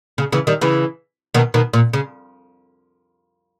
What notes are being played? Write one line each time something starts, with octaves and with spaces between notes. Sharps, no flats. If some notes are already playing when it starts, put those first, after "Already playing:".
C#3
C#3 E3
D#3 G3
C#3 E3
B2 D#3
B2 D#3
A#2
C#3